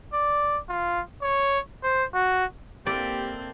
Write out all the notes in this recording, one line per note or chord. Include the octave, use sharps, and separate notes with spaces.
D5
F4
C#5
C5
F#4
A#3 C4 E4 G4 A4 D5